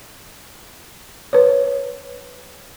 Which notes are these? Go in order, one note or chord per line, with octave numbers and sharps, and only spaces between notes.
B4 C#5